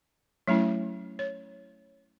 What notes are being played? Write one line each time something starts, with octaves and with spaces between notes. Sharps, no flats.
F#3 A3 C#4 E4
C#5